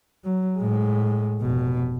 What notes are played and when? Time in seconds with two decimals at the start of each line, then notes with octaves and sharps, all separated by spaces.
0.24 F#3
0.59 A2 G#3
1.41 F1 B2